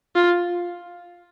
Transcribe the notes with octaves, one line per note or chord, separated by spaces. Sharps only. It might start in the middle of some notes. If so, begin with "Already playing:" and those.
F4